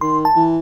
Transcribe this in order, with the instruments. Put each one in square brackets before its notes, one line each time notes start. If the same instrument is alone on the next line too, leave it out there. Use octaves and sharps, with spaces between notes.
[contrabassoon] D#3 [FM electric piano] C6
[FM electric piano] A5
[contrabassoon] E3